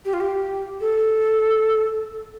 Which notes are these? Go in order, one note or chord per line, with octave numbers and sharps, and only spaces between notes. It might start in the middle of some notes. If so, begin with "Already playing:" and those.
G4
F4
G4
A4